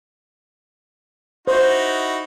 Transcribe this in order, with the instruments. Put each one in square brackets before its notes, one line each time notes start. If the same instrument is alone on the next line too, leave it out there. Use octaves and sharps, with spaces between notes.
[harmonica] D#4 E4 F#4 [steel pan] C5